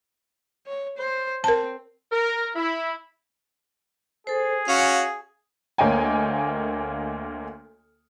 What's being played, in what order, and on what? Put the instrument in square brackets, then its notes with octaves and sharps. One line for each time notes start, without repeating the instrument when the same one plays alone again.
[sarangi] C#5
C5
[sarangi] C4 [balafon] A#4 A5
[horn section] A#4
E4
[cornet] G#4 [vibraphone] A4 C5
[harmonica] C#4 F#4 [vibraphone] F5
[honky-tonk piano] D2 A#3 C#5 D#5 G5 G#5